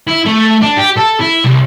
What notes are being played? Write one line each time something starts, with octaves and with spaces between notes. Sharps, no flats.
E4
A3
D4
G4
A4
E4
C2